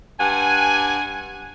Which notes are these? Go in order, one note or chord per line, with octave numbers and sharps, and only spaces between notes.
G2 F#5 G#5